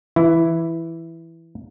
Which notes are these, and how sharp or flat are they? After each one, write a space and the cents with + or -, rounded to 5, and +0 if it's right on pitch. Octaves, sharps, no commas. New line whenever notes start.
E3 +0 E4 +0